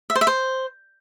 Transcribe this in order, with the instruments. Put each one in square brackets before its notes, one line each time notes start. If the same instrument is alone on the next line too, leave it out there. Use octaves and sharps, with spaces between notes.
[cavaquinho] E5
C5
E5
C5